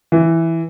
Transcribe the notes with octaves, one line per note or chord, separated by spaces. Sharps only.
E3